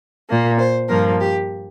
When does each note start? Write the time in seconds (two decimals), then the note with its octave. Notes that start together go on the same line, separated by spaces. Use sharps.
0.29 A#2 A#3
0.59 C5
0.88 G2 F3 A#3 A#4
1.20 G4